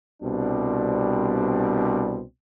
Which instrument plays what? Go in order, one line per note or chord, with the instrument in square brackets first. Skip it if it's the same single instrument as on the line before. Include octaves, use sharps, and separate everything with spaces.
[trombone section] C2 B2 G3 C4 D4